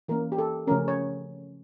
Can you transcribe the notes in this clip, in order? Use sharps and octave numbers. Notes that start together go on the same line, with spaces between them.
E3 A#3 C#4 A#4
G4
A4
C#3 F3 A3 C#4 A#4
C#5